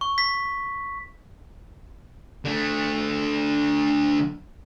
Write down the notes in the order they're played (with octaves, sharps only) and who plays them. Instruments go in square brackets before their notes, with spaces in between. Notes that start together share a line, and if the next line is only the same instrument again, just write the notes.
[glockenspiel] C#6
B6
[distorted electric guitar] D3 A3